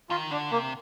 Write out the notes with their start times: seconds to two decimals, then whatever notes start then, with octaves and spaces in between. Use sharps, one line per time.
0.10 D#3 F4
0.31 D3 D4
0.51 C3 A#3